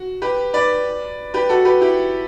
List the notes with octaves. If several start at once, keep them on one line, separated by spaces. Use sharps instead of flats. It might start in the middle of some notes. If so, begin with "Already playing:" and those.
Already playing: F#4
G4 B4
B4 D5
G4 B4
F#4 A4
G4 B4
E4 G4